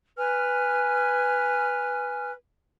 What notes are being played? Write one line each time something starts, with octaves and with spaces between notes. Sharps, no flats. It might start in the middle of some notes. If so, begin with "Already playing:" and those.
B4 G#5 F6